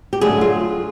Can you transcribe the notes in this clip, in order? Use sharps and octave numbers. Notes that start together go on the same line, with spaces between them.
G4
D3 F#3 A3 G#4
F4